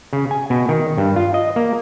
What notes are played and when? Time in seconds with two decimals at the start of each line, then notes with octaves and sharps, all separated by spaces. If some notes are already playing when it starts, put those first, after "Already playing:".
0.13 C#3
0.31 G#5
0.50 B2
0.69 D#3
0.97 G2
1.16 F4
1.34 D#5
1.56 A#3